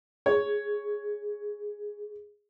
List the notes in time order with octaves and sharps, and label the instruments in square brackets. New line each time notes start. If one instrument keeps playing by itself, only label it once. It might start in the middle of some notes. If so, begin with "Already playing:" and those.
[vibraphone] G#4 [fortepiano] C#5